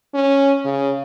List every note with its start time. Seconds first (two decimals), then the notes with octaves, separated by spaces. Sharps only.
0.14 C#4
0.65 C#3